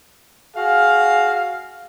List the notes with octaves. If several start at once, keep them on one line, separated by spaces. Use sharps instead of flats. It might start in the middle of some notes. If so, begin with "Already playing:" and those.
F#4 G#4 F5